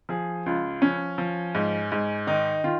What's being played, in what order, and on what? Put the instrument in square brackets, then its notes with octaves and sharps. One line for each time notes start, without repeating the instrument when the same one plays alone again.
[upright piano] F3 G#4
C#2 F4
F3 C#4
F3
G#2
G#2
D#3 D#4
D#3 F4